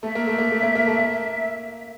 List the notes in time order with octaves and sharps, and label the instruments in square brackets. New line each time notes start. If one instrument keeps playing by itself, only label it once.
[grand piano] A3 [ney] E5
[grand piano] A#3
A3
A#3
A3
A#3
A#3
A3
A#3